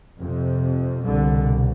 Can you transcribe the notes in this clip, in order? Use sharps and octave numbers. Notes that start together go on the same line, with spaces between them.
F2 C3
C2 B2 D3